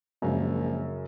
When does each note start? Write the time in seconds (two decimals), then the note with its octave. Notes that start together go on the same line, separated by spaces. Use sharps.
0.22 A#1 F#2 C#3 G#3